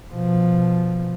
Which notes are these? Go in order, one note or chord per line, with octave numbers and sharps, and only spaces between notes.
B2 F3